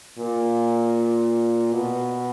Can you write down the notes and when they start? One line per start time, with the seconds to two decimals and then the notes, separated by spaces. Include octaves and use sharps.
0.18 A#2
1.73 B2